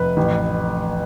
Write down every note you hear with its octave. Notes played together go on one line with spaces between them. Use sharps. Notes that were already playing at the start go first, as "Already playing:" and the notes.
Already playing: F1 B4
A1